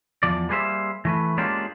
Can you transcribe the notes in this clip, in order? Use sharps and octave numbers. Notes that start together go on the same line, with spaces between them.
E2 F3 D5
G3 A#3 G#4 B4 C5 E5
E3 A3 B4
G#3 A#3 C#4 D4 F4 G4